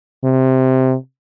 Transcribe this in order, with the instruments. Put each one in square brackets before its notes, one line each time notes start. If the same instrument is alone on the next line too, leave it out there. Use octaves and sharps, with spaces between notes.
[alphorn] C3